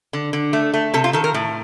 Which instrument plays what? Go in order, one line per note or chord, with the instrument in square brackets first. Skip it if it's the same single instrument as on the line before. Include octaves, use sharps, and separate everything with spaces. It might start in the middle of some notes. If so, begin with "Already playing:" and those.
[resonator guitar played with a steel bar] D3
D3
A3
A3
C3 A4
F4
D#3 A4
A#4
A2